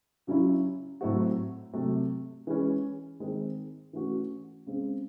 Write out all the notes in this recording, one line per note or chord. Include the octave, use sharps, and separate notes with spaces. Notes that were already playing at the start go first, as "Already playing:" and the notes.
C#3 F#3 C#4 E4
A2 F#3 A3 C4 F#4
C3 F#3 A3
E3 G#3 C#4
D#3 G#3 C4
E3 A3 C#4 F#4
C#3 G#3 C4